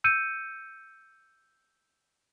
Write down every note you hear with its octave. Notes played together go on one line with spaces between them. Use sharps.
E6 G6 C#7 D#7